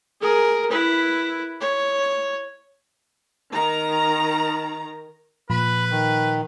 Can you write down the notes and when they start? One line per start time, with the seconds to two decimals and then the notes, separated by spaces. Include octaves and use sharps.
0.21 G#4 A#4
0.70 E4 B4
1.61 C#5
3.52 D#3 A#5
5.50 A#2 F3 B4 B5
5.91 D#3